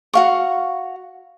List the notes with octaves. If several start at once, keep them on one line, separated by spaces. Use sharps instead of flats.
F#4 F5 C#6